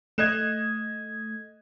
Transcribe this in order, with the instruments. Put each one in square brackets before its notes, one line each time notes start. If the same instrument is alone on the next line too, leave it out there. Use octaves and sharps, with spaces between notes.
[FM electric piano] A3 G#6 [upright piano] D#5 F#6 E7